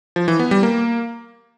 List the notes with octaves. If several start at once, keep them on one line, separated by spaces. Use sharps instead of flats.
F3
E3
B3
G3
A#3